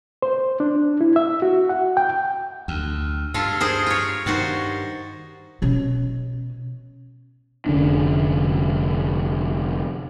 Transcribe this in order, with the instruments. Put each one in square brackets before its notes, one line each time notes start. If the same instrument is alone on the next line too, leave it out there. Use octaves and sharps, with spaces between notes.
[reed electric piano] C5
D4
E4
E5
F#4
F#5
G5
[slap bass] D2
[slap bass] G2 [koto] F4 A4 F5
[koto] G#4 A#4 C5
F4 C#5
[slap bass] G2 [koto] D#3 F#4 C5
[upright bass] B2 C#4
[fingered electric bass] F1 D3 C#4 D4